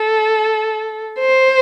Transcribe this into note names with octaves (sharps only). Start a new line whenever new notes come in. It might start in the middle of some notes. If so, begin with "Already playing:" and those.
Already playing: A4
C5